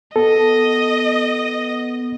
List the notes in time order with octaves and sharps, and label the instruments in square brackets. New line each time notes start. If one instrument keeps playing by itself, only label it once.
[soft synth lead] B3 [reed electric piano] A4 [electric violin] D#5